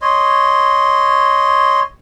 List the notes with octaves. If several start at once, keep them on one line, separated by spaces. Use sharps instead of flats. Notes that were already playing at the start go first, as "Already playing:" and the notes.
C#5 D#5 C6